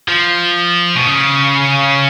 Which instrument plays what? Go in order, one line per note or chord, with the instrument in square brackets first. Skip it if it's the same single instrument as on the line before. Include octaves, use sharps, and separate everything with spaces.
[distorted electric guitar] F3
B2
C#3